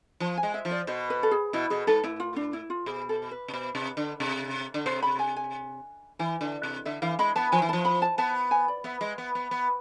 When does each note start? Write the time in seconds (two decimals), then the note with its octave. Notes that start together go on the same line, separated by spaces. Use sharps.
0.20 F3 A5
0.37 G#5
0.43 G#3
0.54 E5
0.65 F3
0.71 D5
0.87 B2 C5
1.10 B4
1.23 A4
1.31 G#4
1.53 B2 E4
1.70 B2 G#4
1.87 G#2 A4
2.04 A2 E4
2.20 F4
2.36 D4
2.53 E4
2.70 F4
2.86 B2 G#4
3.09 A4
3.31 B4
3.48 C3
3.54 B2
3.75 C3
3.97 D3
4.20 C3
4.74 D3
4.86 C3 C5
5.02 B5
5.19 G#5
5.36 G#5
6.19 E3 G#5
6.41 D3
6.63 C3
6.85 D3 E5
7.02 E3 F5
7.19 G#3 B5
7.36 B3 A5
7.52 F3 G#5
7.62 E3
7.69 F3 A5
7.85 B5
8.02 A5
8.18 B3 A5
8.51 G#5
8.68 D5
8.84 B3 E5
9.01 G#3
9.18 B3
9.35 B3
9.51 B3